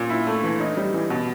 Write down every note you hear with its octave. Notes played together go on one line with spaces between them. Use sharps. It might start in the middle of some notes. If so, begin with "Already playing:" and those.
Already playing: A#2
E4
A3
E3
D#4
G3
E3
B2